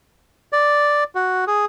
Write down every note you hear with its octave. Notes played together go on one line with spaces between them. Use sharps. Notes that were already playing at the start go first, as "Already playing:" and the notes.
D5
F#4
G#4